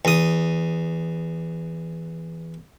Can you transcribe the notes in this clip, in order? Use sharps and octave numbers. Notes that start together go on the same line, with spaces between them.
E2 D#6